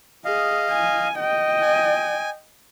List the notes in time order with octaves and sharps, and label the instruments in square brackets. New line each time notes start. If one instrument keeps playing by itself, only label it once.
[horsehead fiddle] G#4 [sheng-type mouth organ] D#5 F5
[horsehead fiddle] G#5
D#5 G5
[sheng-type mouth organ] G#5